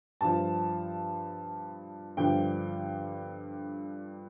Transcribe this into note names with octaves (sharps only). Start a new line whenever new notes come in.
G2 F3 A5
G2 D3 F3 G5